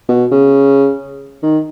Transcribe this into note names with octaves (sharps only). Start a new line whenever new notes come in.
B2
C#3
D#3